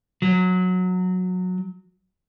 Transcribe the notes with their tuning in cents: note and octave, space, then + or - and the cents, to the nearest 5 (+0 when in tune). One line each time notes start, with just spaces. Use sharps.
F#3 -15